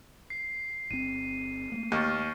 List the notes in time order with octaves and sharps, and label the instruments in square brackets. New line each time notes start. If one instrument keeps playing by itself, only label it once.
[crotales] C7
[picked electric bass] G1 C4 [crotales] D#7
[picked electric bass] A3 A#3
[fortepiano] D#2 [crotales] C#6 F6 A6